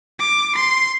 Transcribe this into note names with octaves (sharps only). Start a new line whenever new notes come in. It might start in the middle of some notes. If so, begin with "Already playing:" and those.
D6
C6